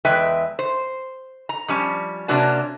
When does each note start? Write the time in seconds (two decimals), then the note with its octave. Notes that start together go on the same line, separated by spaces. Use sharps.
0.05 E2 G#3 B4 E5 G5
0.59 C5
1.49 A#5
1.68 F3 G3 C#4
2.28 C3 A#3 C#4 D4 F#4 A5